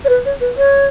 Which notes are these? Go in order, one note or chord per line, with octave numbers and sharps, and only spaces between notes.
C#5
B4
C#5
B4
C#5